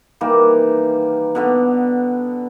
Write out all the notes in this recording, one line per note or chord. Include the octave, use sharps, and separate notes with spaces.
D#3 E3 G3 A#3
B2 D3 B3